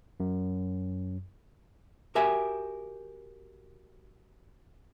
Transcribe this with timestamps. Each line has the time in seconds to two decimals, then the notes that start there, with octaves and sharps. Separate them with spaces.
0.20 F#2
2.15 F#4 G4 A#4 E5 G#5